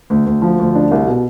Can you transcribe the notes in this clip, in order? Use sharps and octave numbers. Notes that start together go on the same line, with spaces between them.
D2
D2
F3
D2
D4
C2
B2